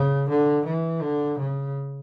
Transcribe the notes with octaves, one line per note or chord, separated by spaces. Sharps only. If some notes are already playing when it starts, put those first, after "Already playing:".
Already playing: C#3
D3
E3
D3
C#3